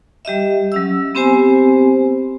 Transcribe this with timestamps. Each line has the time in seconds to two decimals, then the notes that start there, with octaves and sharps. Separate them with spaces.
0.25 G3 G4 D#5 E5
0.72 F#3 C#4 E6
1.15 B3 C4 G4 C5 G#5